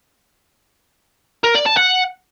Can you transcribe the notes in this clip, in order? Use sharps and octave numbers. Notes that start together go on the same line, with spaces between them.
A#4
D5
A5
F#5